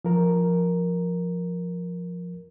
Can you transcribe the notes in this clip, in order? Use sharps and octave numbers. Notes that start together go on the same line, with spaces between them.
F3 A#4